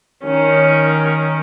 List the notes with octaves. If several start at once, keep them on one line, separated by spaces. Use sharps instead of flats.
D#3 C#4